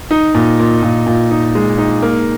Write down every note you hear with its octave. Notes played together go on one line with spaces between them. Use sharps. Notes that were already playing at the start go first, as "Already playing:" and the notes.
D#4
A#2
A#2
A#2
A#2
D#4
G#3
D#4
A#3